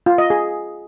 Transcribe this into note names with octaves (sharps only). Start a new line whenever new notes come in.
F4
D#5
G#4